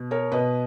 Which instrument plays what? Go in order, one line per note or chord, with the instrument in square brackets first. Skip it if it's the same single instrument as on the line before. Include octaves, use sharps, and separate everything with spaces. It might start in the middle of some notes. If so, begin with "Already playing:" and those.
Already playing: [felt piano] B2
A#4 C#5
B2 B4 D#5